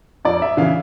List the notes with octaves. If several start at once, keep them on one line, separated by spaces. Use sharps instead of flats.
F2 D5
E5
C#3 E3 F5